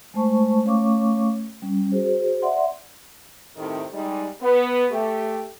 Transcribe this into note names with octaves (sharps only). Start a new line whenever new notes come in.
G#3 A3 C5 A5 C#6
A3 C#4 C#5 F5 C#6 D6
G3 C#4
F#4 G#4 C5
D5 E5 F#5 C6
A2 C3 D#3
G3 G#3 D#4
B3
A3 G4